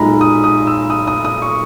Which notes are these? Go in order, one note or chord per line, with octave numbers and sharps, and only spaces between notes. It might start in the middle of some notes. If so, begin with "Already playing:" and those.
Already playing: B1 A#2 G#3 A#5 B5
D#6
D#6
E6
D#6
D#6
D#6
C#6